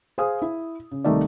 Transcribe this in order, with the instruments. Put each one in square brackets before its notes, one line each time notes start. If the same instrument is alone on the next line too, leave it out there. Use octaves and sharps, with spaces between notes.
[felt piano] G#4 C5 F5 G#5 D#6
E4
C#3
C2 C3 D#3 A3 D#4 D5